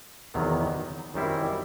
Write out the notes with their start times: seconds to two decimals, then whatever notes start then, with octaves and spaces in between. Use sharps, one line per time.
0.34 E2 C3 D#3 F#3 B3
1.14 F#2 D#3 G3 C4 E4